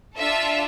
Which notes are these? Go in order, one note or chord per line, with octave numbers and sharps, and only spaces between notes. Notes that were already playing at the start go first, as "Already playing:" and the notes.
D4 F4 A4 E5